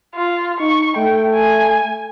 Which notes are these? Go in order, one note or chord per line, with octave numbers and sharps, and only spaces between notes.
F4
D#4 C#6
A3 G5
G#5